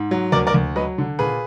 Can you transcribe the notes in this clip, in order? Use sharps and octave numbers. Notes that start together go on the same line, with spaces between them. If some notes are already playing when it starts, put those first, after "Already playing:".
Already playing: G#2
F#3
D2 A#4 D5
A#4 D5
D2
F#3 B4 D#5
D3
A#2 G#4 B4